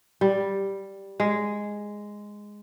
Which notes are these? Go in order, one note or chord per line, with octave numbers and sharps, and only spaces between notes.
G3
G#3